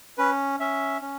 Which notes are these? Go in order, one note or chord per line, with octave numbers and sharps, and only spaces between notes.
C#4 B4
C#4 E5
C#4